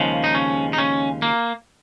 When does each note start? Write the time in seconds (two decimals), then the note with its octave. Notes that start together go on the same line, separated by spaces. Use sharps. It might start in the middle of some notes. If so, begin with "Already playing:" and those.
Already playing: D#2 C#3 F3 G#3
0.24 D#4
0.35 C#4
0.73 D#4
0.78 C#4
1.22 A#3